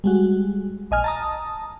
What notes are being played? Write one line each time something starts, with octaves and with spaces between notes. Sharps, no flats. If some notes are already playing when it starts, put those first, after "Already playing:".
G3 G#3 F#4
A#1 D#5 G#5 F6
A5 A#5 D#6